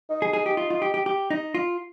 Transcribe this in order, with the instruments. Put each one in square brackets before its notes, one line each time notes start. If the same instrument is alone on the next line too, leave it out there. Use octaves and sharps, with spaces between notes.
[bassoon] D#4
[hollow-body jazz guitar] G#4
G#4
G4
F4
F4
G4
G4
G4
D#4
F4